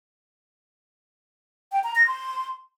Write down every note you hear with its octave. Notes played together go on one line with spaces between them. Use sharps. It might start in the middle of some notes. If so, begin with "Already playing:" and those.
G5
A#5
A#6
C6